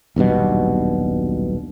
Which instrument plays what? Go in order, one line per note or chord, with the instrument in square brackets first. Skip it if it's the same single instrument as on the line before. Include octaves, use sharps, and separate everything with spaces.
[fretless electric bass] D#1 B1 G2 B2